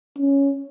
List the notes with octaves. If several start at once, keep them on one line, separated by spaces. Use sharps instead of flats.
C#4